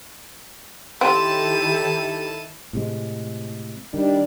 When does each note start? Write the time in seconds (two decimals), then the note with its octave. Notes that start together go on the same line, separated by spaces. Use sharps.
1.01 D#3 C4 E4 G4 A4 A5 D#7
2.73 A2 C3 G#3
3.94 D#3 G3 D4